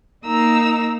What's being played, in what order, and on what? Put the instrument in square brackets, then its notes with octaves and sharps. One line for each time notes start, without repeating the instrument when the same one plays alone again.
[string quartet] A#3 D#4 A#5 E6